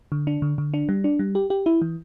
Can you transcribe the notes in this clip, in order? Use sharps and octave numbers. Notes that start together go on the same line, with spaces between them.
D3
D4
D3
D3
D4
G3
D4
G3
G4
G4
E4
E3